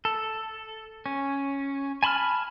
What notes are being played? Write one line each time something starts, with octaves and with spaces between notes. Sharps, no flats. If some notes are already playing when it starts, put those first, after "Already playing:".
A4
C#4
G#5 A5 B5 C6 F6